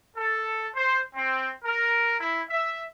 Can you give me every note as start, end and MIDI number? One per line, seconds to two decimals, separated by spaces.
0.17 0.66 69
0.76 1.00 72
1.16 1.47 60
1.65 2.15 70
2.20 2.41 64
2.50 2.83 76